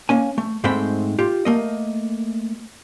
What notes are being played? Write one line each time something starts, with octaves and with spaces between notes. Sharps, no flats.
A#3 C#4 G#5
A3
G#2 G#3 A3 C4 G5 B5
F4 G4
A3 A#3 D#5